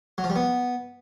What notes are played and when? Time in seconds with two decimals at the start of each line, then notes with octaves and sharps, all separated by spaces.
0.18 F#3
0.24 F3
0.30 G3
0.36 B3